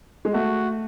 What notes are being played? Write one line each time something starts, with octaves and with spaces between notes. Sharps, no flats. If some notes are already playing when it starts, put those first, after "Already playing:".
G#3
A3 F#4